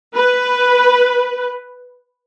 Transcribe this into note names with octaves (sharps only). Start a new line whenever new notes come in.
B4